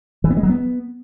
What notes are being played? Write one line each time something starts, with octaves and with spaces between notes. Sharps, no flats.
E3
B3
G#3
F#3
B3